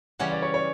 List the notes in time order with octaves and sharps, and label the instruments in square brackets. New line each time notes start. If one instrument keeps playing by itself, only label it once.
[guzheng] C#3 E3 G3 C#4 G4 [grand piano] F#5
[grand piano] D5
C#5
C#5